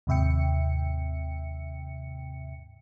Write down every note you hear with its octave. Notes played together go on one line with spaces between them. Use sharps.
D#2 G#2 C3 E5 G5 C#7